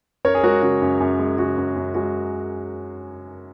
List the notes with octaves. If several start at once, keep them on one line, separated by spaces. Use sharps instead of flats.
F#2 A#4 C#5
G#4
G#3 F#4 A#4
C#3 F#4
F#2
F#2
G#3
C#3 F#4
F#2
F#2
G#3 F#4